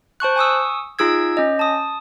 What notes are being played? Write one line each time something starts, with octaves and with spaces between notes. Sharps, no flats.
C5 A5 C#6 F#6
G#5 C#6 D#6 E6
D#4 F4 G#4 E6 G#6
C#4 D#5
A5 D#6